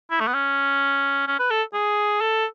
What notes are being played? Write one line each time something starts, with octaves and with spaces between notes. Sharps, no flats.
E4
A3
B3
C#4
C#4
B4
A4
G#4
A4